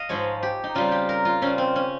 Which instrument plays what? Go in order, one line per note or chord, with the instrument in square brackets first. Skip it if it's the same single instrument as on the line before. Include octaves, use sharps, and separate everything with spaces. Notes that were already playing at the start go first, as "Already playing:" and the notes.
Already playing: [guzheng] D#5 F5
G#2 F3 G#3 C#5
G4
D#4
C#3 G3 C4 F4
G4
A#4
F4
C#3 G3 C4 C#4
C4
C#4